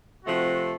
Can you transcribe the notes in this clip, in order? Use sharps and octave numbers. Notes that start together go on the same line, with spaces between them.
C3 F3 A3 C4 F#4